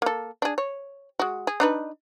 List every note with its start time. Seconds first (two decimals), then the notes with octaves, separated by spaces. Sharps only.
0.02 A#3 A4
0.42 D4 G#4
0.58 C#5
1.19 G#3 F#4
1.47 G#4
1.60 D4 D#4 B4